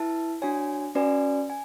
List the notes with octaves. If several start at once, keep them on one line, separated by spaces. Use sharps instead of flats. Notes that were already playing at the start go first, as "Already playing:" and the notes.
Already playing: E4 B4 E5 A5
D4 F#4 C#5 G#5
C#4 F#4 B4 D5 G#5
G#5